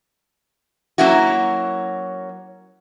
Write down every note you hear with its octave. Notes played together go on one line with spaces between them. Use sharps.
F#3 A#3 C#4 E4 F#4